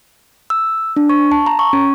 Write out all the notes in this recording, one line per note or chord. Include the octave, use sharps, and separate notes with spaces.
E6
D4
C#6
A5
A#5
C#6
C#4